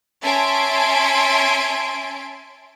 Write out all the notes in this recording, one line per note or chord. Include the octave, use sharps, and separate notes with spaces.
C#4 E5 G#5 A5 C6 D7